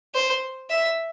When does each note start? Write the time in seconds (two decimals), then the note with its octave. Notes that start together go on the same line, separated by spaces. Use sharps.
0.15 C5
0.70 E5